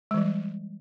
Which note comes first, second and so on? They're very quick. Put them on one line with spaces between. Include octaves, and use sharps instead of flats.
G#3 E3 G3